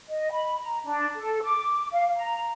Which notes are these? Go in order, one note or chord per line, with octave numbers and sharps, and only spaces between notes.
D#5
B5
A#5
D4
A4
D6
F5
A#5